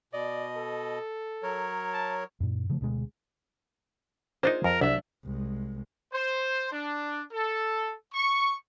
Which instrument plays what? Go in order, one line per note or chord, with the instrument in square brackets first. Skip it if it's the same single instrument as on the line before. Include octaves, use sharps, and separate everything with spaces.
[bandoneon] B2 D#5 [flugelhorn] D5
[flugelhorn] A4
[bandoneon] F#3 A#4 C#5
[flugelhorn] A5
[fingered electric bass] F#2 A#2
C#3 F3 A3
D2 B2 G#3
[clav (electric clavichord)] A#3 D4 D#4 [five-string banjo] F4 G#4 C5
[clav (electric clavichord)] F2 [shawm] A#4
[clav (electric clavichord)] C2 [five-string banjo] F#3 D4 [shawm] E5
[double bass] C2 G#3
[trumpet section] C5
D4
A4
C#6